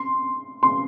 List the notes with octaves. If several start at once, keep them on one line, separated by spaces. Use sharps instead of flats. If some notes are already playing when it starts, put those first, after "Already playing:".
Already playing: C6
C6